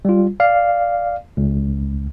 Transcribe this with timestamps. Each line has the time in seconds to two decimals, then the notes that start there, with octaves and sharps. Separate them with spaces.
0.05 G3 F4
0.40 D5 F5
1.37 C#2